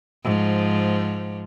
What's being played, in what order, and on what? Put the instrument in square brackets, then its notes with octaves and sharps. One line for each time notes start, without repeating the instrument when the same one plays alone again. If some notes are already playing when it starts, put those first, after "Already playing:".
[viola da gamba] G#2 F3